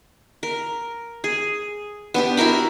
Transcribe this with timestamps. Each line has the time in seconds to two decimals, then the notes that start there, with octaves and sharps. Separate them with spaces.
0.43 A#4
1.24 G#4
2.14 B3 D4 G4
2.37 E4 F#4 A#4 B5